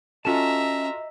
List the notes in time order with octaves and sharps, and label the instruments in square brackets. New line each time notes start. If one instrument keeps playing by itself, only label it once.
[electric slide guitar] C#4 A5 [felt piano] F4 F#4 A4 [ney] D#5 [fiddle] E5 A#5